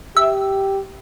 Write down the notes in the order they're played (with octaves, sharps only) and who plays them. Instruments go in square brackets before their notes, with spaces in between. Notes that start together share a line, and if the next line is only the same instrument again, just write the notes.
[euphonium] G4 [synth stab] E5